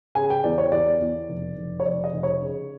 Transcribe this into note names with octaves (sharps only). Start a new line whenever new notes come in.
C#3 G#5
G5
E2 D5
C#5
E2 D5
E2
F1
F1
C#5
F1 D5
D#5
F1
C#5
C#3